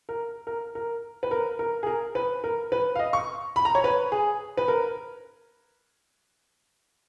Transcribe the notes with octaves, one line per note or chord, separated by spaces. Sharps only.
A#4
A#4
A#4
B4
A#4
A#4
G#4
A#4
B4
A#4
B4
F5
D#5
C#6
B5
A#5
C#5
B4
G#4
B4
A#4